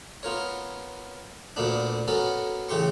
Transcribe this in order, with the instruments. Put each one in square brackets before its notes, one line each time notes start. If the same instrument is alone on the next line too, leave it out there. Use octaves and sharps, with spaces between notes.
[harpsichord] B3 F4 A#4 C#5
D2 A#2 A#3 B3 D4
B3 C#4 F#4 A4 A#4
A1 C#3 G4 C6 C#6